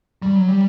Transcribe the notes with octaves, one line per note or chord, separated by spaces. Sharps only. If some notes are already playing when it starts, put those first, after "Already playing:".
G3
F#3
G3